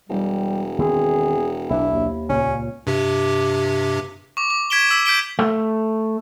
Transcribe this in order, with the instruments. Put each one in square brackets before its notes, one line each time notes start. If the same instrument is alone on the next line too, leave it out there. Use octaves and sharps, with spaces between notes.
[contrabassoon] E1 [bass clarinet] G3
[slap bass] D#3 B3 C4 [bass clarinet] G#4
[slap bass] B1 D4 [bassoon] E4
[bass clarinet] D#2
[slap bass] C#2 A#2 [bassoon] C#4
[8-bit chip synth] G2 C3 G4
[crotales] C#6 D6
D6
G#6 B6 D7 E7 G7
E6 B6
G6 B6 D7 G7
[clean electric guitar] A3